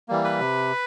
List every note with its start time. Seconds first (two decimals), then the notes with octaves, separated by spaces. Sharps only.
0.09 E3 G3 A#3
0.24 B4 B5
0.40 C3